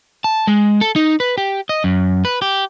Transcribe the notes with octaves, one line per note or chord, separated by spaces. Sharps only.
A5
G#3
A4
D#4
B4
G4
D#5
F#2
B4
G4